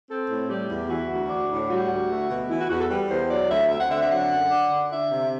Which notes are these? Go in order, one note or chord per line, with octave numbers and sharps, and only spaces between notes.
C4 A4
A2
G3 G4
E2
E3 F#4
D2
D4
A2
G3 F#4
D2
A3
B2
E3 E4
F#4
E2 F#4
A4
G3 B4
E2 C5
F#3 D5
D2 E5
C4 E5
F#5
D3 E5
E5
F#3 F#5
F#2
D4
D3
D4 E5
C3